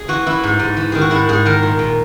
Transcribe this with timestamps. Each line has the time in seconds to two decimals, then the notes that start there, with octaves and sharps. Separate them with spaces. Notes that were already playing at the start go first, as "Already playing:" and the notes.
Already playing: G#4
0.08 E3 F#4
0.26 E3 E4
0.43 G#2
0.59 G#2
0.77 E3
0.92 D#3 G#4
1.01 F#4
1.10 G#2 E4
1.29 G#2 G#4
1.45 D#3 A#4
1.63 A#2
1.79 A#2